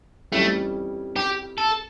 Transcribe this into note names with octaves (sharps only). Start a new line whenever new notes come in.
F2 E3 G3 A3 C#4
G4
A4